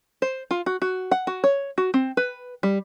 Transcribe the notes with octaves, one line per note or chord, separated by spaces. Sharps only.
C5
F4
F#4
F#4
F#5
F#4
C#5
F#4
C4
B4
G3